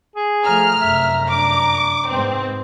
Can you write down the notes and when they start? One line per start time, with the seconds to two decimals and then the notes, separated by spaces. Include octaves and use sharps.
0.16 G#4
0.46 F3 A3 A#5 F6
0.80 F1 F#2 E5
1.28 D4 D6
2.07 G#2 B3 C4